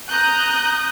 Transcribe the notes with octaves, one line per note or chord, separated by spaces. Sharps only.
A#5 D#6 F#6 G6